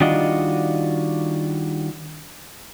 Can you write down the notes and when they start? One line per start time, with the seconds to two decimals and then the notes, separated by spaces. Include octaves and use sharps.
0.01 D#3 G3 D4 F4 F#4 D#5